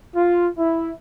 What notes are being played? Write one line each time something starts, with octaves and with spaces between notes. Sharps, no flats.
F4
E4